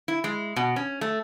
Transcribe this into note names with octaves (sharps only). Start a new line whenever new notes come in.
E4
G#3
B2
C#4
A3